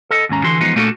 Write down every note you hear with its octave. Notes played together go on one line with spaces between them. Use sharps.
A4 D#5
D#2 G#2 C#4 A#5
D3 E3 F#4 C6
E3 F3 G#3 B3 D#4
A#2 A3 A#3 D4 F#4 A4